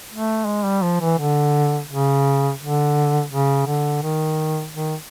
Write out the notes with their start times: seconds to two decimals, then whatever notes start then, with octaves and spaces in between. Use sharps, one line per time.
0.12 A3
0.46 G#3
0.64 G3
0.82 F3
1.01 E3
1.18 D3
1.88 C#3
2.60 D3
3.31 C#3
3.66 D3
4.02 D#3
4.73 D#3